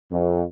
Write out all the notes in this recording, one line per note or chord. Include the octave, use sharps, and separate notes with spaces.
F2